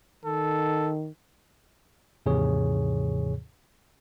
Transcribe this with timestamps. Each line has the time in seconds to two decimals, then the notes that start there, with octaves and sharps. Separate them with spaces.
0.25 D#3 A4
2.26 D#2 G#2 C3 E3 G#4 C#5